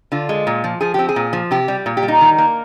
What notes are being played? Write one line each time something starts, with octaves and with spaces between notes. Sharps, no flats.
D3 F4
G#3
A#2
F3
F3 G#4
C4 G4
G#4
A#2
F3
C3 G4
G3
A#2
G4
G3
D#4
D#3
A#3